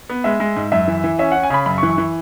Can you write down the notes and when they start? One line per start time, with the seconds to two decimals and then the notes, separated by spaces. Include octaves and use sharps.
0.09 B3
0.24 G#3 E5
0.40 G#3
0.56 G#2
0.72 F#2 E5
0.88 E3
1.04 E3
1.19 C#4 E5
1.32 C#4 F#5
1.43 G#5
1.50 C#3 B5
1.66 F#2 B5
1.78 C#6
1.83 E3
1.90 C#6
1.98 E3